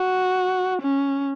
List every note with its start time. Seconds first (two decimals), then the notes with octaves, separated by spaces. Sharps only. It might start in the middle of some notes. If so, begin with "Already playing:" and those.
Already playing: F#4
0.82 C#4